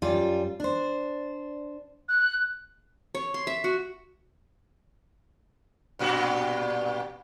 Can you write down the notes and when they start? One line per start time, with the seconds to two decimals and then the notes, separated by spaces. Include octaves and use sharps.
0.02 F#2 G3 F4
0.60 D4 C5
2.09 F#6
3.15 C#5
3.34 C6
3.47 E5
3.64 F#4
5.99 G2 A#2 F#4